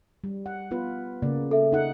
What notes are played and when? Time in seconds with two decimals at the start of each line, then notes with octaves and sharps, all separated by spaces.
0.24 G3
0.46 F#5
0.71 B3 F4 B4
1.22 C#3 A#3 D5
1.51 A4 E5
1.72 D#4 F#5